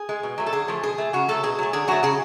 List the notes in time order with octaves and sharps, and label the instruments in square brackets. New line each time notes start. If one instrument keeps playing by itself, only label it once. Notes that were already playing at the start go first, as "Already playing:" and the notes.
Already playing: [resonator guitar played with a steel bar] G#4
G#3
B2
F#3 A3
A4
D3 G#4
F3 A3
B2 G#4
A3
C#3 F#4
F#3 A3 A4
B2 G#4
F#3 A3
D3 G#4
F#3 A3 F#4
C#3 G#4